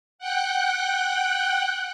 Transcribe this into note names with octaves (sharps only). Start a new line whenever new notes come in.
F#5 G5 F#6